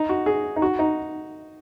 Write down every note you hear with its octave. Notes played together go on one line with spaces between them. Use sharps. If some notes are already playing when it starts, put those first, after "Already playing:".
Already playing: D#4
F#4
G#4
D#4
F#4
D#4